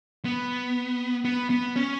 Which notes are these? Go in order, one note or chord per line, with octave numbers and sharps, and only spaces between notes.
B3
B3
B3
C#4